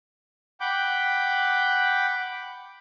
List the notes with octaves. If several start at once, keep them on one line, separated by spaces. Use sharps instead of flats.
F#5 G5 B5 D6 G6